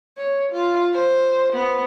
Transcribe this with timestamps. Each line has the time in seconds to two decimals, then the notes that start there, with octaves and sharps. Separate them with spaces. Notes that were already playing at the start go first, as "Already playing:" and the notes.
0.18 C#5
0.52 F4
0.93 C5
1.53 B3